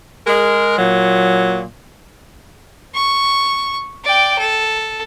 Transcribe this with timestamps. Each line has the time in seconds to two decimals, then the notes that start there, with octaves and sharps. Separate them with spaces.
0.27 G#3 A#4
0.78 A#2 F#3
2.95 C#6
4.04 D5 G5
4.38 A4